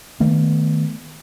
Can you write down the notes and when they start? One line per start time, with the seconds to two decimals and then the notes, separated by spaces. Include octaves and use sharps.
0.20 D#3 A3 B3